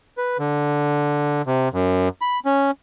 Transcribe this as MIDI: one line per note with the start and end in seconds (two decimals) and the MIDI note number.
0.18 0.37 71
0.39 1.42 50
1.47 1.69 48
1.73 2.08 42
2.21 2.40 83
2.45 2.71 61